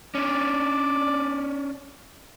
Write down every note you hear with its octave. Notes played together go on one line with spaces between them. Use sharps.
C#4 D4 D5